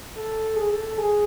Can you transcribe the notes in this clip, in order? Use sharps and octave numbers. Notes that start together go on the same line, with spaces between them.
A4
G#4
A4
A4
G#4